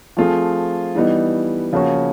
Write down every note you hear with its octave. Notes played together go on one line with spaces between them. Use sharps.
F3 A3 C4 F4 G#4
E3 G3 B3 D#4
C#3 F3 A#3 C#4 F#4